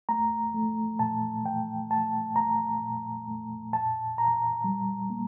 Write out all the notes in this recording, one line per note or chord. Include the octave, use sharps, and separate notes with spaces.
A3 A#5
A3
A#2 A5
A3 G5
A3 A5
A3 A#5
A#2
A3
A#2 A5
A#2 A#5
G3
A#3